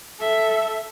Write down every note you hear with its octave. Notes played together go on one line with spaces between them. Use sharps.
A4 E5